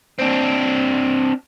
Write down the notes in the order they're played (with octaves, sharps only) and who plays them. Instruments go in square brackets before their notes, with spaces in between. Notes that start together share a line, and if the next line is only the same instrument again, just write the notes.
[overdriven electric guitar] C4 D4